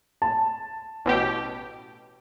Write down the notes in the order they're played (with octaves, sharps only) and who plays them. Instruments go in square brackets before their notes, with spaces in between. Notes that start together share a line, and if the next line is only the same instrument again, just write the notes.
[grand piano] A5
[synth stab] A1 B2 G4